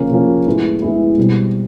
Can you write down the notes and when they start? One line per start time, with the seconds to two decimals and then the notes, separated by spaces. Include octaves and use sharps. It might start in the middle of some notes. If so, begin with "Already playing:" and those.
Already playing: C#3 F3 A#3 C#4
0.11 C#3 F3 A#3 C#4
0.46 A2 E3 G#3 B3 E4
0.82 A2 E3 G#3 B3 E4
1.17 B2 G3 C4